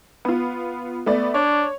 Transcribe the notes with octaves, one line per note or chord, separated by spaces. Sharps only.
B3 F4
A3 B3 D5
D4 C#5